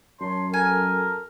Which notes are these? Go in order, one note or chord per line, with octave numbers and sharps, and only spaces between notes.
F#2 A#4 C#5 A5 C6
A4 A#4 G#5